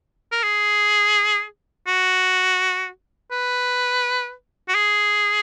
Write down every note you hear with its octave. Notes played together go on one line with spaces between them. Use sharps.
A#4
G#4
F#4
B4
F#4
G#4